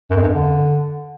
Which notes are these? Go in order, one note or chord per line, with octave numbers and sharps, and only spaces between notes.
F#2
F2
G2
F2
D3